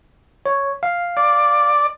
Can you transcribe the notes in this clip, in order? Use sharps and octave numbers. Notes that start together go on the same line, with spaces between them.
C#5
F5
D5